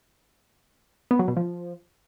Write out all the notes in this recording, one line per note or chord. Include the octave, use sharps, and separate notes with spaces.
B3
F#3
B2
F3